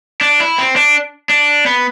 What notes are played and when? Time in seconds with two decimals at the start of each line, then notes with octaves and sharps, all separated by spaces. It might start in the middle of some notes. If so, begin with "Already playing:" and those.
0.21 D4
0.40 E4
0.58 C4
0.76 D4
1.29 D4
1.66 B3